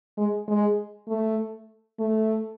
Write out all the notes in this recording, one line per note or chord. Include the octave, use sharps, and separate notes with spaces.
G#3
G#3
A3
A3